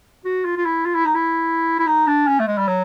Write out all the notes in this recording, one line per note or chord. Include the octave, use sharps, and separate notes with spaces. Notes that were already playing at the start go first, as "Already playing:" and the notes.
F#4
F4
F4
E4
F4
E4
D#4
E4
E4
D#4
D4
C#4
A3
G#3
G3
F#3